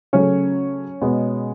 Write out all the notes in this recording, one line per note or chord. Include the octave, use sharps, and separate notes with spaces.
C#3 F#3 A3 C#4 C#5
B2 G#3 B3